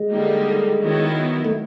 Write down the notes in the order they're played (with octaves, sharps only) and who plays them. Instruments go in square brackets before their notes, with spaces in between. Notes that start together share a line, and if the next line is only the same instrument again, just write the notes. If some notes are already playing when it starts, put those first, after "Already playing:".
Already playing: [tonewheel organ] G#3
[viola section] D3 G3 A#3 D#4
D#3 F#3 B3 E4
[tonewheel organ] A3